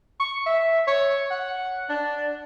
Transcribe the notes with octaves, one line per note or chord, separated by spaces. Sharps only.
C#6
E5
C#5
F#5
D4